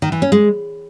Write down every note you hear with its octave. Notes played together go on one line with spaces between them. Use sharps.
D#3
E3
C#4
G#3